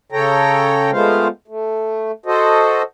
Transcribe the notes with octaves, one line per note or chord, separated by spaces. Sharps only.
C#3 A4 C#5 G5 A#5
G#3 A3 B3 F4 C5 F5
A3
F#4 A4 C5 D#5